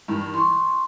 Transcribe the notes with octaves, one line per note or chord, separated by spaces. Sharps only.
G2 D#3 E3
E3 C6 C#6